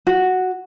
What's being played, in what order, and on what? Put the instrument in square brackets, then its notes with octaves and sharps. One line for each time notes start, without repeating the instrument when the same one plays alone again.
[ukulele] F#4